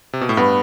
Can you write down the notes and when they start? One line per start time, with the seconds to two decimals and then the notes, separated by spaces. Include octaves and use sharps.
0.13 C3
0.21 B2
0.29 A2
0.37 G2 B3